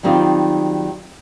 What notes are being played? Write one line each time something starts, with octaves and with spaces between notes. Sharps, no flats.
D#3 F#3 G3 C4 D#4 F4